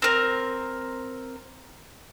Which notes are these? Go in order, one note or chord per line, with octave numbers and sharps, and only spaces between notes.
C4 A#4